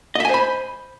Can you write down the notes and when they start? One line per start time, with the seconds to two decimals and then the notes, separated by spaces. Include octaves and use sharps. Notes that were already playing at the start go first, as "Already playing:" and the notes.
0.15 D#5
0.20 E5
0.25 G#5
0.29 C5
0.34 B5